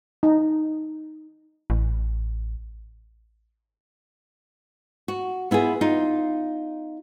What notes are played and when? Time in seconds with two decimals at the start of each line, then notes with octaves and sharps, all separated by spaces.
0.23 D#4
1.70 A1
5.08 F#4
5.51 B3 E4 F4 G#4
5.81 D#4 F4